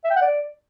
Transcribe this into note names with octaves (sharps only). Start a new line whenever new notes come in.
E5
G5
F#5
D5